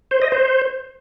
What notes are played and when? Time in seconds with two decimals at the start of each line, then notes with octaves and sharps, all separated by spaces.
0.11 C5
0.22 D#5
0.32 C5